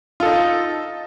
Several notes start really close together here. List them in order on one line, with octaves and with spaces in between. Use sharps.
F4 A4 D#4